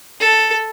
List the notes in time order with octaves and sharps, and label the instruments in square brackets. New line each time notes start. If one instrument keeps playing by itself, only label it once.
[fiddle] A4